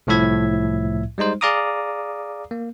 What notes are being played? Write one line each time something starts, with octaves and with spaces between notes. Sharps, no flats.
C2 A2 F3 E4 E5 G#6
G3 G#3 D#4 C5
G#4 D5 F5 A#5 D6 D#6
A#3